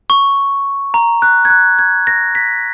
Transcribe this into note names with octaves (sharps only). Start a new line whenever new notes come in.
C#6
A#5
F#6
G#6
F#6
G#6
A#6
B6